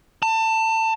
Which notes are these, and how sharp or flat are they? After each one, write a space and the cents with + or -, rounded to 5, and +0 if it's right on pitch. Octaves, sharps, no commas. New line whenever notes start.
A5 +25